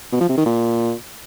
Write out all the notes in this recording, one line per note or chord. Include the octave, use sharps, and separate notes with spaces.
B2
F3
C3
D#3
A#2